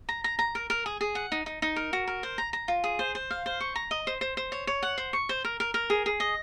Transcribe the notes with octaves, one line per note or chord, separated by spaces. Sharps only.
A#5
A#5
A#5
A#4
A#4
G#4
G#4
F#5
D#4
D#4
D#4
A#4
F#4
A#4
C5
A#5
A#5
F4
G#4
C5
C5
F5
C5
C#6
A#5
D#5
C5
C5
C5
C#5
C#5
F#5
C5
C#6
C5
A#4
A#4
A#4
G#4
G#4
D#5